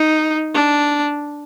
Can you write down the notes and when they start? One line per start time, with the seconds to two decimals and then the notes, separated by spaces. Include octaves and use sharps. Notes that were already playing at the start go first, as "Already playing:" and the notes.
Already playing: D#4
0.54 D4